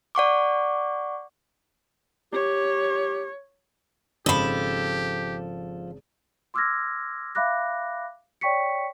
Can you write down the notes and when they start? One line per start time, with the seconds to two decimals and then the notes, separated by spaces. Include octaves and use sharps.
0.15 D5 F#5 C#6 D6
2.33 G4 C#5
4.26 G#1 C#3 F3 G4 A4 D#5 B5
6.54 C6 D6 E6 F6 G#6 A#6
7.35 E5 F5 B5 D6 F#6 A#6
8.41 C#5 D5 G5 C#6 B6 C#7